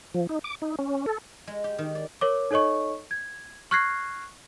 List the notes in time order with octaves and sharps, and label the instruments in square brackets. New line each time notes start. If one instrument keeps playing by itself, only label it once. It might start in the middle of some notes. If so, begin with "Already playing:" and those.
[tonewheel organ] F3
D#4
D6
D#4
C#4
A4
[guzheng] G#3
G4
D#3
D5
[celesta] A#4 C#5 D6
D#4 A4 C#5 D#5 C#6
G#6
C#6 F6 F#6 G#6 A#6 C7